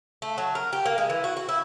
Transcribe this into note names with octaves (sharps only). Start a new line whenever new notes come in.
A3
F#3
A#4
G4
A#3
G#3
E3
F#4
F#4
E4